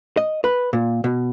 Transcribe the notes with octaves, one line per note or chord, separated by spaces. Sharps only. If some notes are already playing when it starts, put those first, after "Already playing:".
D#5
B4
A#2
B2